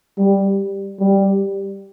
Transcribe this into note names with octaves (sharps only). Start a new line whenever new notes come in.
G3
G3